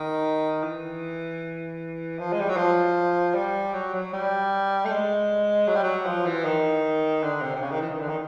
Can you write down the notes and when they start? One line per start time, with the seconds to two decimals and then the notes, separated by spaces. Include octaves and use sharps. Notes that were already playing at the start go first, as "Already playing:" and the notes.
Already playing: D#3
0.63 E3
2.19 F3
2.33 G#3
2.40 G3
2.49 F#3
2.57 F3
3.35 G3
3.73 F#3
3.94 F#3
4.13 G3
4.85 A3
4.91 G#3
5.67 F#3
5.75 G3
5.83 F#3
6.06 F3
6.25 E3
6.45 D#3
7.23 D3
7.42 C3
7.55 C3
7.61 C#3
7.71 D#3
7.81 E3
7.91 D#3
8.01 D3
8.09 D#3